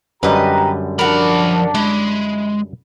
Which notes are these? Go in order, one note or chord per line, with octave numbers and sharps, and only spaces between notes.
F#2 D3 G3 G4 B4 D#5 A#5
F3 D4 F#4 A#4 B5
G#3 E4